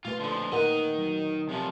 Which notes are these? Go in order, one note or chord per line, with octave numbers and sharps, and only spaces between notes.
A#2 A3 F4 B4
D3 F3
A#2 D#3 A#4 D#5 F#5
F#3
C3 F3